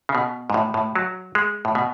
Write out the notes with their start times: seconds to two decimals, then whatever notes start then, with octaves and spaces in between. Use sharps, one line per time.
0.09 C#3
0.15 B2
0.50 G#2
0.54 A2
0.74 A2
0.95 F#3
1.35 G#3
1.65 A2
1.75 B2